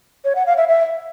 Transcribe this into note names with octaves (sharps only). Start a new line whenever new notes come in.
C#5
F#5
F5
E5
E5